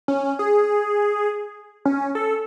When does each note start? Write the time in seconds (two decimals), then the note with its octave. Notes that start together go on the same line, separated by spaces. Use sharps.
0.08 C#4
0.39 G#4
1.86 C#4
2.15 A4